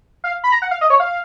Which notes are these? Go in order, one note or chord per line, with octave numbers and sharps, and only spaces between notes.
F5
B5
A#5
F#5
F5
D#5
C#5
F5